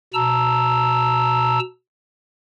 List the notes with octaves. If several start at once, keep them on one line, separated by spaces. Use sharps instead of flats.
B2 A5 A#5 E6